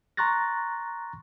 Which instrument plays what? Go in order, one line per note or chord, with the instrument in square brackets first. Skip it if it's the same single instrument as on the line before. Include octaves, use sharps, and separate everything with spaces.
[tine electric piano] A#5 C6 C#6 F#6 A6 A#6